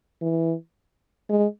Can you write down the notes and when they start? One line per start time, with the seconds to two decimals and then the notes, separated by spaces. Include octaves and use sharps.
0.21 E3
1.29 G#3